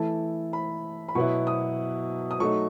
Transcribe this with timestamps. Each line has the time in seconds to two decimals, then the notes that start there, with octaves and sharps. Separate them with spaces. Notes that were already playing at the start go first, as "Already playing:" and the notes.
Already playing: E3 A3 E4 A5
0.53 B5
1.09 B5
1.15 B2 F#3 B3 E4 C#6
1.47 D#6
2.31 D#6
2.40 F#3 A3 D#4 C#6